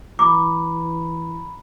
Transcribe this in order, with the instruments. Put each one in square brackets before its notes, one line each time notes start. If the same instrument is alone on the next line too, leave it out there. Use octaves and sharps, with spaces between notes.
[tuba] E3 [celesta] A#5 B5 [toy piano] D6